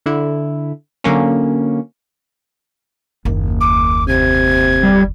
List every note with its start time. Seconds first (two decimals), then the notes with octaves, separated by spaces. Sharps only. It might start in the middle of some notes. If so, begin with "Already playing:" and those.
0.06 D3 E4
1.04 D3 F#3 A#3 C#4
3.25 F#1 D#2
3.60 D6
4.08 C3 G#6
4.83 G3